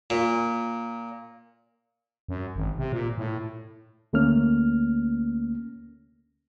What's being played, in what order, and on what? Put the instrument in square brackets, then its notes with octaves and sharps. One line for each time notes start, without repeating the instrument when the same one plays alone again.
[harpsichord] A#2
[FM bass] F#2
G#1
C3
A#2
A2
[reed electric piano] D2 A3 A#3 C#4 F6